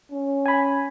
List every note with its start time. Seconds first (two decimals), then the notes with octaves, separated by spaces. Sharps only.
0.12 C#4
0.46 G#5 B5